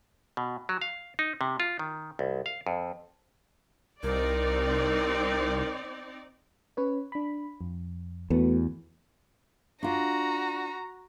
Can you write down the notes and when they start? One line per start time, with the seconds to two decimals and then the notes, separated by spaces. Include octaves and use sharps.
0.37 B2
0.69 F#3
0.82 F5
1.19 D#4
1.41 C3
1.60 F4
1.79 D#3
2.19 C2
2.46 F5
2.67 F2
4.03 C2 C4 D#4 A#4 D5
6.77 C#4 B4 C#5
7.12 D4 B5
7.61 F2
8.30 E2 A3 B3 F#4
9.83 D4 F4 F#4 A#5